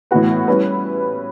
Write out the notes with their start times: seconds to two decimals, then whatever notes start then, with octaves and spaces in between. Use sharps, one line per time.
0.11 A2 E3 B3 F#4 B4
0.48 G3 C#4 E4 B4